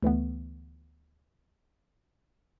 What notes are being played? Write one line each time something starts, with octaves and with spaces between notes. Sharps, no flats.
D2 E3 A3 B3